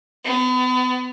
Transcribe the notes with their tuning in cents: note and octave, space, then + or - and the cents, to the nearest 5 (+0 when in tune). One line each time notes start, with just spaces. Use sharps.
B3 +35